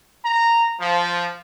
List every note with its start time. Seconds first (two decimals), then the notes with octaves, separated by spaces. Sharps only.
0.25 A#5
0.80 F3